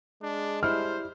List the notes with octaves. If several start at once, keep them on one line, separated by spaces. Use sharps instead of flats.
G#3 D4
G3 E4 C5 F6